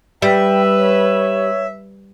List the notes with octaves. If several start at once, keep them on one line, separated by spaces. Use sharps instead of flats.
G3 B4 E5 G5
C#5